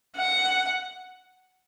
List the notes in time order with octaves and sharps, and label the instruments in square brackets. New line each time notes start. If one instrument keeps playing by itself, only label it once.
[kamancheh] F#5